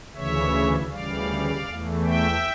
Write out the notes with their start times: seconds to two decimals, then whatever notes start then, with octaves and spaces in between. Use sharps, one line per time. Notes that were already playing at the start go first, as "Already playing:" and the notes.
0.15 D2 C#3 E3 C#5 E5
0.90 D2 C#3 E3 G3 D5 F5
1.67 E2 E3 A3
2.04 E5 G5